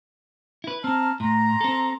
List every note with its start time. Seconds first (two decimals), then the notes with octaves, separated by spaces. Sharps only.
0.64 E4 B4
0.84 C4 A5 A#5 F6
1.20 A2 A#5 C6
1.61 C4 A4